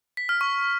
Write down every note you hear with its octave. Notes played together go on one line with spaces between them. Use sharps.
B6
F6
C#6